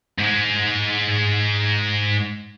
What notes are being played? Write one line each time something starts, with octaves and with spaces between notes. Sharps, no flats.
G#2 G#3